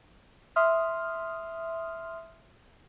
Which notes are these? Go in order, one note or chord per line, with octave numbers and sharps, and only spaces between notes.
E5 C6 D#6 F6